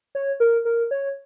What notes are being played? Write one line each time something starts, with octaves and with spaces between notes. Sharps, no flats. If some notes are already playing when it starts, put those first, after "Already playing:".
C#5
A#4
A#4
C#5